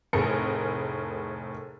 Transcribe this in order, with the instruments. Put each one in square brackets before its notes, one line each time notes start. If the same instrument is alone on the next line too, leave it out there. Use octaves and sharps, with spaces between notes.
[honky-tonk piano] F1 A2 G#4 A#4 C#7